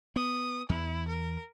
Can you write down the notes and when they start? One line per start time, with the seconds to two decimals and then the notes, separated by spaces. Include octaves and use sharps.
0.16 B3 D#6
0.69 E2 E4
1.08 A#4